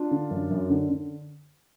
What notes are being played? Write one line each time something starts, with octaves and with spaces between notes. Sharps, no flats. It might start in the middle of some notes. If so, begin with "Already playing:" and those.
Already playing: D4 F4
D3
F#2
F#2
D3
D3